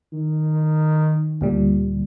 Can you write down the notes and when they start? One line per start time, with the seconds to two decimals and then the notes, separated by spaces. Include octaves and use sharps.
0.13 D#3
1.41 D2 A#2 G3